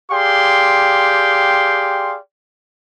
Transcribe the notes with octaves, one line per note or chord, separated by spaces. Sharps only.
G4 G#4 D5 F5 G5 C6